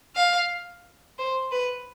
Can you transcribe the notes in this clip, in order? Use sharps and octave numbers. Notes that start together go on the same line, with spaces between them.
F5
C5
B4